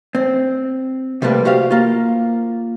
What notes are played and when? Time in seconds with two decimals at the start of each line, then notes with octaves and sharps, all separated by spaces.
0.15 C4
1.22 C3 G3 A3 A#3 B4
1.45 F#4 G4 C5 F5
1.71 A#3 F4